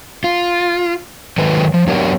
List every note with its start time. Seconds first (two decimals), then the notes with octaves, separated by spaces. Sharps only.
0.24 F4
1.38 D#3 F#3 A4 B4
1.74 F3
1.87 F#3 B3 D4 G4 A#4 C#5